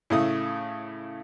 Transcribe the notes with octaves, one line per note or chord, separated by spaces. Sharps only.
A2 C#3 A3 D#6